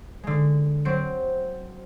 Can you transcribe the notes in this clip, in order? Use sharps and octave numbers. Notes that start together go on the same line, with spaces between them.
D3 G#3
F#3 C4 D7